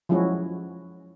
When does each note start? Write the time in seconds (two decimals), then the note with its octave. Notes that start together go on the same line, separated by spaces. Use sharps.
0.09 F3 F#3 G#3 C#4 E4 F#4